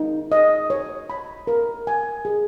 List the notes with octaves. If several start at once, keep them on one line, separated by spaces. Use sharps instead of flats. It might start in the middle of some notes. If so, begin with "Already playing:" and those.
Already playing: D#4
D#5
C#5
B5
A#4
G#5
G#4